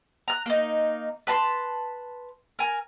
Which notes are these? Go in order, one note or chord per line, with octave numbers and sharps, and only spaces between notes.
A#5 F#6
A#3 D#4
B4 A5 A#5 C6
A#4 G#5